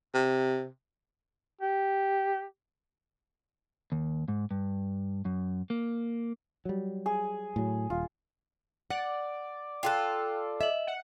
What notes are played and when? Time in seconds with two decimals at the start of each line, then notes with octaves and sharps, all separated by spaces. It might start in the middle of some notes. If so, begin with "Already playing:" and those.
0.14 C3
1.61 G4
3.92 D#2
4.28 G#2
4.51 G2
5.25 F#2
5.70 A#3
6.65 F#3 G3
7.06 G#4
7.56 A2 F#3
7.90 D#1 F4
8.90 D5 F#5
9.83 F4 G#4 A4 G5 F#6
10.61 D#5 E5 F#7
10.87 F#5